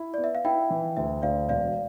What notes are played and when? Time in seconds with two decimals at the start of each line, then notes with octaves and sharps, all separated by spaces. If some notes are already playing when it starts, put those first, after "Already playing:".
Already playing: E4
0.14 B3 D5
0.24 E5
0.35 F5
0.45 E4 E5 G5
0.70 E3
0.97 D2 E5
1.22 D2 D5 F5
1.48 E1 D5 F5